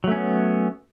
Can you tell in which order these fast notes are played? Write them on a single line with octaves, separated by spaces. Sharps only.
F#3 A3 C#4 B3